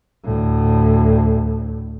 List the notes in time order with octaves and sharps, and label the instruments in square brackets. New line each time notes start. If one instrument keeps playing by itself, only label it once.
[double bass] D2 A2